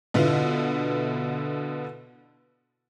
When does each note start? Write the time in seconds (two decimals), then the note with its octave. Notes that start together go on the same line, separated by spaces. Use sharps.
0.14 B2 D3 B3 E4 F4